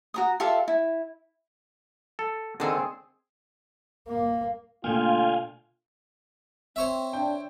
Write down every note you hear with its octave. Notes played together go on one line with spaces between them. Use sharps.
F#4 A#5 D#6
F4 G4 A4 E5
E4
A4
D3 D#3 C4 G#4 A4
A#3
B2 D3 A3 A#3 F4 F5 G5 G#5
C4 C5 C#5 E5
D4 G5